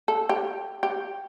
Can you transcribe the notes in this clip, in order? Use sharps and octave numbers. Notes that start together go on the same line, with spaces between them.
A4
G4
G4